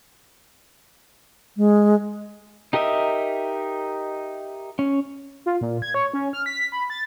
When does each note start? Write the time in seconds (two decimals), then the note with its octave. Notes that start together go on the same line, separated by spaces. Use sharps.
1.57 G#3
2.73 D#4 G4 A#4 D#5 E5
4.79 C#4
5.46 F4
5.61 A#2
5.82 G#6
5.94 C#5
6.14 C#4
6.33 F6
6.46 B6
6.72 B5
6.90 A6